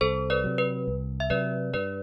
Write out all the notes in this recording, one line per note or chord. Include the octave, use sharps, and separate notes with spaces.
C2 A4 C5
B4 D5
C3 F#3
B4
C2
E5
C3 F#3 B4 D5
G2 B4 D5